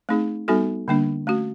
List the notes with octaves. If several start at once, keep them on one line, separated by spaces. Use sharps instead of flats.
A3 C4 D#4 G#4
G3 B3 D#4 F#4 A4
D3 G3 A#3 D4
A3 C#4 F#4